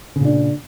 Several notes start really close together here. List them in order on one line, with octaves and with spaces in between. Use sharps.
C#3 A#2 D4